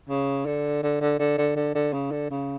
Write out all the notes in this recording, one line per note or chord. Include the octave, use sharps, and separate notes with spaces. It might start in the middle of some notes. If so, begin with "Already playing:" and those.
C#3
D3
D3
D3
D3
D3
D3
D3
C#3
D3
C#3